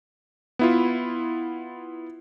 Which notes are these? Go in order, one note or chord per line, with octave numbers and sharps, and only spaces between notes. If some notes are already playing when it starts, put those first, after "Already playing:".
B3 E4 F4